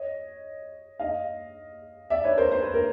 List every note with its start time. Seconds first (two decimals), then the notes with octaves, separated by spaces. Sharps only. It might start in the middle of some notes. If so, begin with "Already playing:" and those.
Already playing: C#5 D#5
0.99 D#5 F5
2.10 D5 E5
2.24 B4 C#5
2.37 A#4 C5
2.51 C5
2.63 B4
2.74 A#4